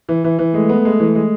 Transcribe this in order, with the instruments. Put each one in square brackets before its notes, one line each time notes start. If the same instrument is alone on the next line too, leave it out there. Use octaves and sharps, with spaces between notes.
[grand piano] E3
E3
E3
[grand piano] G#3 [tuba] A3
[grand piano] B3
G#3
E3
G#3